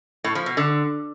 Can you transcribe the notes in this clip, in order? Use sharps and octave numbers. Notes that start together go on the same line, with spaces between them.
A2
F3
B2
D3